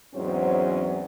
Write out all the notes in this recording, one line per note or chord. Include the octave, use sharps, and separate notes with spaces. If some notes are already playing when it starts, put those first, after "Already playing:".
E2 G#2 F#3 C4 C#4 C5